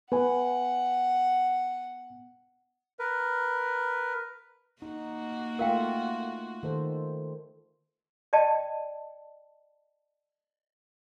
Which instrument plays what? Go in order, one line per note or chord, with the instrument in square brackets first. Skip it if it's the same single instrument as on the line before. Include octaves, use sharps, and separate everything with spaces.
[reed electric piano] B3 G#5 [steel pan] B4 [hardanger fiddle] F#5
[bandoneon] A#4 B4
[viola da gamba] A#3 F#4 [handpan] D#4
[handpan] A3 F4 [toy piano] A#4 F5 G5
[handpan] D#3 A4 C5
[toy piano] D5 D#5 G5 A5